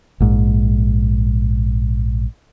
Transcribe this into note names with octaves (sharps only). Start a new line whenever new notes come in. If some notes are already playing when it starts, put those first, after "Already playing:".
A#1 G#2